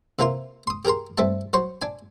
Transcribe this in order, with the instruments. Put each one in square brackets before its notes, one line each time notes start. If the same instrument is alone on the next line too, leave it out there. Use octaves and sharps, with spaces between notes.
[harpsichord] C3 E3 A#3 F4 A#4 C6
C6 D#6
G4 G#4 A#4 A#5 C6
G2 A3 C4 E5 A5
F#3 C5 C6 C#6
D4 G#5